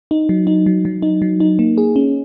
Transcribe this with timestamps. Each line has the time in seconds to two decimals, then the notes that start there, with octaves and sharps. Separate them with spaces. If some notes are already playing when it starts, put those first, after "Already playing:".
0.11 D#4
0.29 F#3
0.47 D#4
0.66 F#3
0.85 F#3
1.02 D#4
1.22 F#3
1.40 D#4
1.59 A#3
1.78 G#4
1.96 C#4